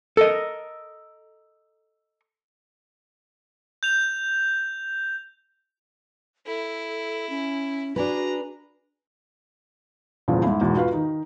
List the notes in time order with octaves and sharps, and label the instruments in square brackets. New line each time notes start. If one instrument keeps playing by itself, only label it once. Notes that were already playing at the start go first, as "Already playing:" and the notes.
[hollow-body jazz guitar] A4 A#4 D#5
[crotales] G6 F7
[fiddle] E4 [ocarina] A4
[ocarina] C#4
[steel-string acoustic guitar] D4 G#4 B4 [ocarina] F#4 [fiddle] A#5
[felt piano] D#1 E2 A#2 C#3 F3 C#4
G#2 E4
E2 G#2 B2
F4 F#4 B4 F5
D#3 D#4